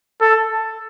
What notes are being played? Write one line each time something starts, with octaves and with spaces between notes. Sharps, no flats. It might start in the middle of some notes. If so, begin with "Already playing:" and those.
A4